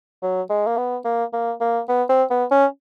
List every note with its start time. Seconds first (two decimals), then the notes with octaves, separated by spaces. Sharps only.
0.22 F#3
0.50 G#3
0.66 A#3
0.77 B3
1.05 A#3
1.33 A#3
1.61 A#3
1.89 B3
2.09 C4
2.30 B3
2.51 C#4